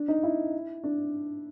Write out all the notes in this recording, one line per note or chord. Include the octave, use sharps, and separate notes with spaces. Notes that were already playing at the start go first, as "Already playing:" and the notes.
Already playing: D4
D#4
E4
D4